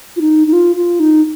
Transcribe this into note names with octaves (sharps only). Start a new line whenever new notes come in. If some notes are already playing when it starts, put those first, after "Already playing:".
F4
D#4
D#4
F4
F4
D#4